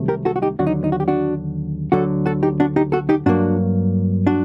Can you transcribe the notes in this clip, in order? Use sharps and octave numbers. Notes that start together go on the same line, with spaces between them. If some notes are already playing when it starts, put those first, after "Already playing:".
Already playing: C2 C3 D#3 F#3 A3
G4 A#4
F#4 A4
F#4
D#4 G4
D#2 D3 F#3 D4 F#4
D#4
D#4
F#4
G4
D4 F#4
D2 D3 F#3 F#4 A4
F#4 A4
D#4 G4
D4 F#4
D#4 G4
F#4 A4
D#4 G4
G2 F#3 A#3 D4 F#4
D4 F#4